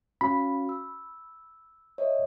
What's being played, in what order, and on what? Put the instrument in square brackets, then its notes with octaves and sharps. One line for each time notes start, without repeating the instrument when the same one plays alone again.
[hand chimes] C#4 F#4 F5 [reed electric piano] B5
[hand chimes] E6
C#5 D#5 E5